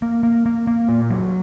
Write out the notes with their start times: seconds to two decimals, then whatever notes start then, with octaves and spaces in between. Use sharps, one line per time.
0.02 A#3
0.23 A#3
0.46 A#3
0.67 A#3
0.89 A#2
1.10 F#3